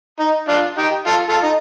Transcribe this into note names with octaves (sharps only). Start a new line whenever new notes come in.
D#4
D4 F4
D#4 G4
F4 A4
F4 A4
D#4